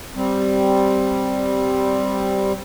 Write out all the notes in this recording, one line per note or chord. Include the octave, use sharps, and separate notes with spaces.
G3 C4